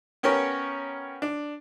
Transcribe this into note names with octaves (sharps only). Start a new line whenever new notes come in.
B3 C#4 G4 A#4 C#5
D4